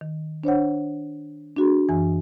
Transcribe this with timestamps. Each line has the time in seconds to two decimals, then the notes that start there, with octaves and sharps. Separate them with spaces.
0.01 D#3
0.44 D4 C5 C#5 F#5
1.56 D4 F#4 G#4
1.89 F#2 E3 G#5